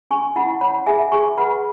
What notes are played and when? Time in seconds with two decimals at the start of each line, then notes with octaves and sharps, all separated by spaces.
0.11 C#4 G#5 C#6
0.36 E4 F#5 B5
0.61 C#5 F#5 B5
0.86 G#4 E5 G#5
1.12 G#4 G#5 C#6
1.38 B4 F#5 B5